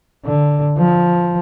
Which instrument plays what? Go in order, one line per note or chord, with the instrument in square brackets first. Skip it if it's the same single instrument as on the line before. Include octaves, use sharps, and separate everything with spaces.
[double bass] D3
F3